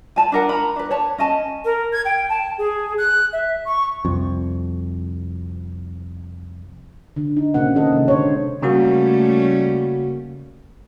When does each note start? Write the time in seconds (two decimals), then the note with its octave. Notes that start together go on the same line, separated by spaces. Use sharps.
0.16 G#5 A5 B5
0.32 D4 A#4 F#5
0.49 A#5 B5
0.76 D4 B4
0.91 C#5 A5
1.18 C#4 D#5 G#5 A5
1.65 A#4
1.93 G#6
2.05 G5
2.29 A5
2.58 G#4
2.98 F#6
3.33 E5
3.65 C#6
4.05 C2 F2
7.16 D3
7.37 D#4
7.54 A#2 C#3 A#3 C4 F#5
7.75 D#3 C4 A4 D#5
7.92 C3 G#3
8.08 D3 C5 C#5
8.62 C#3 G3 A3 A#3 C#4 F#4